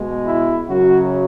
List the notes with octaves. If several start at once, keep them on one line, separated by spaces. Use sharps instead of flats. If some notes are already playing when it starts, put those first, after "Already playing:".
Already playing: B2 G#3
E4
F#2 C#3 F#3 F#4